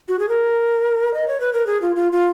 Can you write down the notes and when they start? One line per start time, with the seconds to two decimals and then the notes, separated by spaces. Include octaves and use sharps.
0.08 F#4
0.19 G#4
0.29 A#4
1.14 D#5
1.28 C#5
1.40 B4
1.53 A#4
1.67 G#4
1.82 F4
1.96 F4
2.12 F4